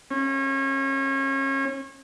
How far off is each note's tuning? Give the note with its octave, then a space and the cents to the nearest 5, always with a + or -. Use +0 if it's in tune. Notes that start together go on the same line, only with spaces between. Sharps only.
C#4 -30